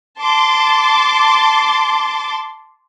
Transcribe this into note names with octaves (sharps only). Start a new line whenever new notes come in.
A5 C6 D6